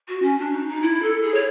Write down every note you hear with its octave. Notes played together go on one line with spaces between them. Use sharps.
F#4
C#4
D4
D#4
D#4
E4
A4
G#4
C#5